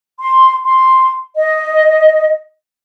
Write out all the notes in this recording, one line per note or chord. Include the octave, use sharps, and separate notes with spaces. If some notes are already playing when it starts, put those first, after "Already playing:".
C6
C6
D#5